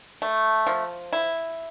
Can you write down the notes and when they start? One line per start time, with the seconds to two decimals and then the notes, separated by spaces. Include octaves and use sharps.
0.22 A3
0.67 F3
1.13 E4